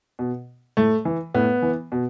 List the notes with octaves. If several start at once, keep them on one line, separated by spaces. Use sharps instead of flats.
B2
A2 A3
E3
A2 B3
E3
B2